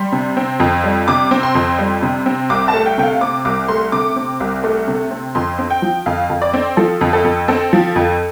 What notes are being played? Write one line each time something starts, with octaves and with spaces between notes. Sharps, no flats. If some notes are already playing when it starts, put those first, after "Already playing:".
Already playing: G3 C6
C3
C4
F2
G3
C3 D6
C4
C6
F2
G3
C3
C4
C2 D6
A5
A3
G5
C3 G5
F5
C4 D6
C2 D6
A3 C6
C3 D6
C4
C2
A3
C3
C4
F2 C6
C4
G5
F3
F2 F5
F2
D5
C4
F3 A4
F2
A4
F2
C4 A4
F3
F2